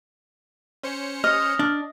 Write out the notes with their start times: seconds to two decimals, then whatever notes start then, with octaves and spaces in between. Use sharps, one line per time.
0.83 C#4 C5 C#7
1.24 D#5 F6
1.59 D4